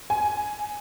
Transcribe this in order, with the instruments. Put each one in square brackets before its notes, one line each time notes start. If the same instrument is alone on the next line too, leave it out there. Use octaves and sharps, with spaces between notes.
[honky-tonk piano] G#5